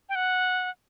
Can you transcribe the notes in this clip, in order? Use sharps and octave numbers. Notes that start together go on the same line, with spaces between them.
G5
F#5